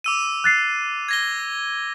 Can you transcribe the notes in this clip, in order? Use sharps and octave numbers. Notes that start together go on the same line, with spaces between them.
D6 E6 D#7
F#6 A6 C7
G#6 A#6 G7